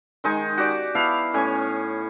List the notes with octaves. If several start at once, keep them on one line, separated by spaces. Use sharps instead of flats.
D#3 G#3 D#4 G#5
F#4 G4 D5 D6
B3 E4 F5 A5
A2 C#4 G#5